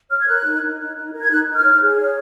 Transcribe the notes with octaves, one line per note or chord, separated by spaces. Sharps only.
C#5 F6
G#6
A#4 F#6
D#4
D#4
D#4
D#4
A#4
G#6
D#4 F#6
D#4
F6
C#5
G#4
C#5